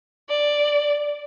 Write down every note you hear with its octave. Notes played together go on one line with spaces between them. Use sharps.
D5